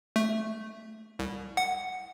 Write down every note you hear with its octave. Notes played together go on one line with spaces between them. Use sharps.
A3
C2
F#5